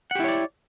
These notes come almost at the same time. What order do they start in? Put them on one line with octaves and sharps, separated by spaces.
F#5 G4 E4 C#5 D5